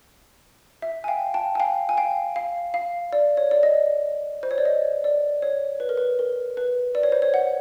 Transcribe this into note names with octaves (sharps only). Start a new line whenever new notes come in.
E5
G#5
F5 G5
G5 A5
G#5
F5 G5
G#5
F5 G5
F5
F5
D5
C#5
D5
D#5
C5
C#5
D5
D#5
D5
C#5
B4
A#4
B4
A#4
B4
D5
C#5
C5
C#5
F#5